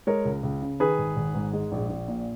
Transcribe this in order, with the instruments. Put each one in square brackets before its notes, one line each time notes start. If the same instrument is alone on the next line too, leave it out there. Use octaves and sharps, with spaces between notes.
[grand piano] G#3 A#4 C#5
C#2
C#2
C#3
D#3 G#4 B4
G#1
G#1
G#2
G#3
A#1
A#1
A#2